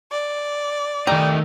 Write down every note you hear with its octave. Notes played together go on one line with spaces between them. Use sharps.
D5
D#3 G3 A3 D#4 A#5